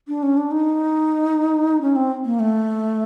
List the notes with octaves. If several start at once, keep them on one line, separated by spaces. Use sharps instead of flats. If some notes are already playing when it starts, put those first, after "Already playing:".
D4
C#4
D4
D#4
C#4
C4
A#3
A3